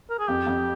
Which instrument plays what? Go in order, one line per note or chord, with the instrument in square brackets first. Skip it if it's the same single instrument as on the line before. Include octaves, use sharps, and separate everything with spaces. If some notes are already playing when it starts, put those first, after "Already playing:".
[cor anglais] A#4
G#4
[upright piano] F2 [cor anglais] G4
[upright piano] F2